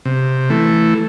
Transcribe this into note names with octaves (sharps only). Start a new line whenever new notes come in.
C3
E3 A3